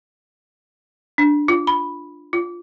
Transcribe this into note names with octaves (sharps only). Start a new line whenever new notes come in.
D4
F4
B5
F4